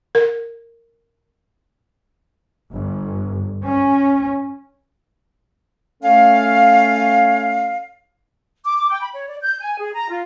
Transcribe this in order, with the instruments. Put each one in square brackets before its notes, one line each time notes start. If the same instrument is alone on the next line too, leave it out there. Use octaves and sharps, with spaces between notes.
[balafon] A#4
[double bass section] G1
C#4
[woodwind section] A3 C#4 A4 C#5 F5
[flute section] D6
D6
G5
B5
C#5
D5
G6
G#5
G#4
A#5
F4